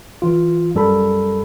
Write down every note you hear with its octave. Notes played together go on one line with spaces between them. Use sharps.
E3 F4
F#2 G3 A4 A#4 B5